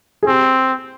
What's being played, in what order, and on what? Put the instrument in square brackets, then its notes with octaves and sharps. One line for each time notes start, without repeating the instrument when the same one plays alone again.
[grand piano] G#4
[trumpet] C4 [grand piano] G4